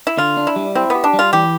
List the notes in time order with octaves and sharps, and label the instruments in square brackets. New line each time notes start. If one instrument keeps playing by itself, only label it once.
[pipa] E4
[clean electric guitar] D3 [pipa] F4
[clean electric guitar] D4
[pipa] E4
[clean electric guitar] G3
[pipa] C4 [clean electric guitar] E4
[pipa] B3 [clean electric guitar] G4
[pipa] D4
[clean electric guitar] G3
[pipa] F4
[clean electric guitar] E3 [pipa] G4